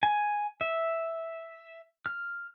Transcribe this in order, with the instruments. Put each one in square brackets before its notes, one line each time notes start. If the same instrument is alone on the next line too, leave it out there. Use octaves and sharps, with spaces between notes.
[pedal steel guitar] G#5
E5
F6